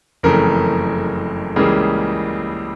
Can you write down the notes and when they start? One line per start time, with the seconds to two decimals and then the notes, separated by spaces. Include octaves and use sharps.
0.23 F#1 F2 C#3 E3 A3 A#4
1.56 C#2 C#3 E3 G3 A#3 G#4